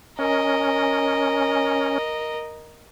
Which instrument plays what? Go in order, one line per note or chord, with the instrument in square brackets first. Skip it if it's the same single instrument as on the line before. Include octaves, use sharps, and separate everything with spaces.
[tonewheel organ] C#4 [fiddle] A#4 D#5